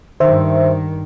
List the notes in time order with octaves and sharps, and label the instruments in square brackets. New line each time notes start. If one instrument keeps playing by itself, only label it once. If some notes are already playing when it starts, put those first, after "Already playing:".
[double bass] G2 D#3 [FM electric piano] C5 E5